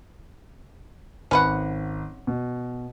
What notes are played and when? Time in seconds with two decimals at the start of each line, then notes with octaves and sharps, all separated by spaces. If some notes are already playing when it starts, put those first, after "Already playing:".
1.31 G#1 C#4 B4 F#5
2.27 B2